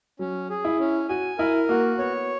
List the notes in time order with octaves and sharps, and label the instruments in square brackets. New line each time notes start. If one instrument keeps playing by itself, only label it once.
[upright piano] F#3 [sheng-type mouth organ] C#4
[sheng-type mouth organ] G#4
[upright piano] E4
[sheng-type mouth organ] C#4
[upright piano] F#4 [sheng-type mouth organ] G#5
[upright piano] E4 [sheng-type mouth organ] A#4
[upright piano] A#3 [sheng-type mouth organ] F#4
[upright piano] B3 [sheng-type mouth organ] C#5